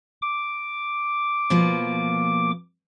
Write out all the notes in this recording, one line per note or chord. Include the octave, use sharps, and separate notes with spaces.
D6
B2 F3 A#3